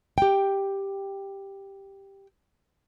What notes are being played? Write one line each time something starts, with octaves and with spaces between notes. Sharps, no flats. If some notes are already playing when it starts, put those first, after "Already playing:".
G4 G5